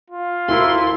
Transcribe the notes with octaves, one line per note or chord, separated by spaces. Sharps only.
F4
D2 E4 A#4 C6